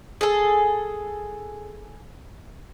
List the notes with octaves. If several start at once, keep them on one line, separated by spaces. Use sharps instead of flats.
G#4 A4